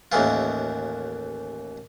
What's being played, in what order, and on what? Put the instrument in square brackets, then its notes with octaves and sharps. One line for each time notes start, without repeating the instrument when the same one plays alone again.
[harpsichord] A1 D#2 D#3 E3 F4